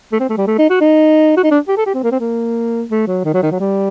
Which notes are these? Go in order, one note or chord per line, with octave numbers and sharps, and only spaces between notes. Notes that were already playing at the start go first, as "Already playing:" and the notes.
A3
C4
A3
G3
A3
D#4
F#4
D#4
F#4
D#4
D4
G4
A4
G4
C4
A#3
C4
A#3
A3
F#3
D#3
F#3
D#3
F#3
G3